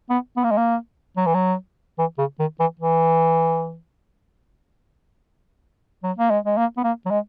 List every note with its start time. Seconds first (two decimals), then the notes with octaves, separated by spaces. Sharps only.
0.10 B3
0.37 B3
0.44 A#3
0.51 G#3
0.58 A#3
1.17 F#3
1.26 E3
1.34 F#3
1.99 E3
2.18 C#3
2.39 D#3
2.60 E3
2.80 E3
6.03 F#3
6.18 A#3
6.30 G#3
6.45 G#3
6.57 A#3
6.77 B3
6.84 A#3
7.06 F#3
7.11 G#3